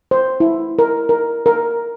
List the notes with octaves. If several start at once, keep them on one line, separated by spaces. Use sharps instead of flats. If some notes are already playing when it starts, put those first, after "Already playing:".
C5
E4
A#4
A#4
A#4